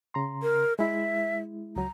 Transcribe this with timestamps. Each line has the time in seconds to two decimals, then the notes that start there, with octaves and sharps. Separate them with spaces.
0.14 C#3 A#5 C6
0.43 A#4
0.79 G#3 E4 E5
1.76 C#2 F#3 A#5